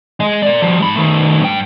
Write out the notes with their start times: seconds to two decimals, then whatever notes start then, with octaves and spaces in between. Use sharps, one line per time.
0.20 G#3 D#5
0.42 A#4 D5
0.62 F3 G3
0.79 G#2 B5
0.96 D#3 A3
1.41 G2 G5